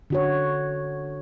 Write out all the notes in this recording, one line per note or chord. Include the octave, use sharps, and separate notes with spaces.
D3 F#4 C#5